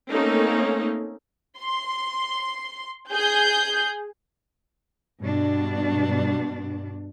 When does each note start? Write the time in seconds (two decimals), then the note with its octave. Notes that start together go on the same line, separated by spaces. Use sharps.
0.11 A3 A#3 C4 C#4 D#4 A4
1.60 C6
3.12 G#4 G6
5.23 G2 B2 D4